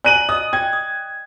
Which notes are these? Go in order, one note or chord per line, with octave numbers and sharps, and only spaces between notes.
D5 G#5 A#5 F#6 D#7 F#7
D#5 D#6
G5 G#6
D#6